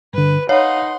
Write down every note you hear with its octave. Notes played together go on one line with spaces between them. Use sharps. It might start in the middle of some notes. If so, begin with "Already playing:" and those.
G2 D3 B4
D#4 C#5 F5 F#5 C6